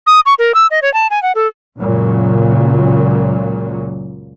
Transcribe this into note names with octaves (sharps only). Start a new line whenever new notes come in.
D#6
C#6
A#4
E6
D#5
C#5
A5
G#5
F#5
A4
C#2 F#2 A#2 C#3 F#3